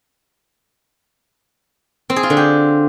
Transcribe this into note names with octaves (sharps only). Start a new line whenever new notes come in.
C4
G#4
F4
D3
G4